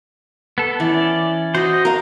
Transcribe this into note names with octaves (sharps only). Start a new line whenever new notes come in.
B3 A4
E3 C#4 D5
F#4 C5 D#5
A#4 F5